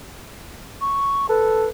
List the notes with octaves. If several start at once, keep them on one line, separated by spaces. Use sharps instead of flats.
C#6
A4 B4